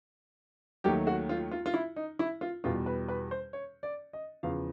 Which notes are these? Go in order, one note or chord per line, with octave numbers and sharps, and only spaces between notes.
D#2 D#3 F#3 A3 G4
F#4
F4
F4
F4
E4
D#4
E4
F4
E2 B2 G3 F4
B4
B4
C5
C#5
D5
D#5
E2 C#3 F3 F5